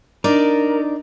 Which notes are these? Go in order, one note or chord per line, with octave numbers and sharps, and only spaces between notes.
D4 D#4 A#4 D5